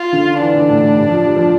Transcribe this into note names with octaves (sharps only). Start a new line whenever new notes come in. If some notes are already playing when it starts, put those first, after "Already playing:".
Already playing: F4
D3
E3 D4
D3
A2
A2
G2
F3
G3
F3